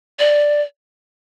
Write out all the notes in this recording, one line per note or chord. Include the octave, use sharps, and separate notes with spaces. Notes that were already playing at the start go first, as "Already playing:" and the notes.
D5